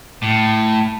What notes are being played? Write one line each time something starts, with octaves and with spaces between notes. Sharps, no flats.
A2